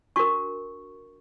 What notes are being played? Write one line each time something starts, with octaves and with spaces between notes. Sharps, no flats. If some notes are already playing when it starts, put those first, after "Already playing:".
D4 F#4 A#4 C#6